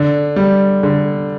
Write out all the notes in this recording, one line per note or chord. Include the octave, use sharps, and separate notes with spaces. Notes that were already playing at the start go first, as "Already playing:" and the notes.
Already playing: D3
G3
D3